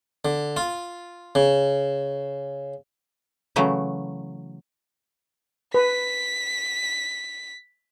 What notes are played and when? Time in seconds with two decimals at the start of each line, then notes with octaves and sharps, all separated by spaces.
0.25 D3
0.57 F4
1.35 C#3
3.56 C#3 E3 F#3 A3
5.74 B4 B6